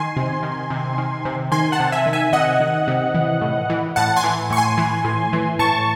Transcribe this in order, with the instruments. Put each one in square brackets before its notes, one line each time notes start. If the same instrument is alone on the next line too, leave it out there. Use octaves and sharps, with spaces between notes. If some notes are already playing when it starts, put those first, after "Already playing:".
Already playing: [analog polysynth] D#3 G#5 C6
C3
D#3
C3
D#3
C3
D#3 G#5 C6
F#5 A5
C3
E5 G#5
D#3
E5 G#5
C3 D#5 F#5
D#3
C3
E3
A2
E3
A2 F#5 A5
G#5 C6
E3
A2 C#6
G#5 C6
E3
A2
E3
A2 A5 C#6